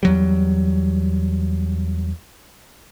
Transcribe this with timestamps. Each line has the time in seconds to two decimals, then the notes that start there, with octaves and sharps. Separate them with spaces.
0.03 E2 F#3 G3